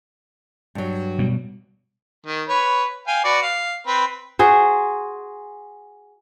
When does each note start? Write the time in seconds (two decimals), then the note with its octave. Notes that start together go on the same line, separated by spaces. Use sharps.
0.75 G2 F#3
1.19 B2 G3
2.26 D#3
2.49 B4 C#5
3.08 F5 G5 G#5
3.25 F#4 B4 D5
3.43 F5
3.87 C4 B4
4.39 F#4 G#4 C5